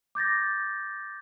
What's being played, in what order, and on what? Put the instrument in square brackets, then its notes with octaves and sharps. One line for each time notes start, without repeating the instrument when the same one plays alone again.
[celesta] D6 G6 A6 A#6